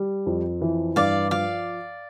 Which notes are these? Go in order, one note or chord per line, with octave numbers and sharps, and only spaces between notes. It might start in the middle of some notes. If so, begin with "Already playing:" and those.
Already playing: G3
F2
E3
G2 D5 F5
F3 D5 F5